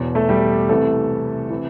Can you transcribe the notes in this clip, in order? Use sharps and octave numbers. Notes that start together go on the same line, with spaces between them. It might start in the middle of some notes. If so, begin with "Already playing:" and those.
Already playing: E1 E2 B2
A3 A4
G3 G4
C2 C3 E3 A3 A4
C3 E3